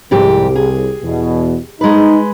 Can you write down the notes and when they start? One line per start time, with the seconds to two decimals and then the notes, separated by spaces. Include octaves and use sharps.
0.11 C2 F2 G#2 G4
0.56 G#4
1.02 E2 B2
1.81 G#3 D#4 B4